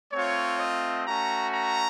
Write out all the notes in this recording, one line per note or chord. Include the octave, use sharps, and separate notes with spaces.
A3 C4 F4 C#5
D#5
A3 C#4 F#4 A#5
A#5